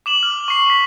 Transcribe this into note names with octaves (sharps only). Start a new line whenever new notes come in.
D6 E7 F#7
F6
C#6 C7
B6